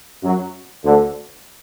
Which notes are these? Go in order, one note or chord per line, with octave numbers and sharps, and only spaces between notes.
F#2 F#3
D2 D3